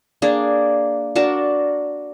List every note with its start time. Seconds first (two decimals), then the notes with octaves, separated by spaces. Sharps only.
0.22 A#3 D4 G#4
1.15 D4 F#4 A#4 A5